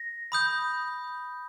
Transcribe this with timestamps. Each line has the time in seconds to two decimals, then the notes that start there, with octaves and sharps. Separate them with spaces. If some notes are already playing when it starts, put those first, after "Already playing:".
Already playing: A#6
0.32 B5 D#6 G6